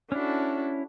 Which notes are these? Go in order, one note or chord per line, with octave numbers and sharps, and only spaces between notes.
C#4 D4 E4 F#4 A4